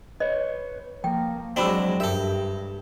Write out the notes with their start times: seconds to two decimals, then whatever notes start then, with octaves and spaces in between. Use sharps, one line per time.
0.20 B4 C#5 D#5
1.04 F3 A#3 G5
1.56 F#3 G#3 C4 D4 F#4 B5 E6
2.00 G2 G4 A4 A#4 E5